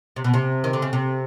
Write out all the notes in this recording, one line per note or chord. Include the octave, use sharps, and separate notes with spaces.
C3
B2
C3
D#3
D3
C#3
C3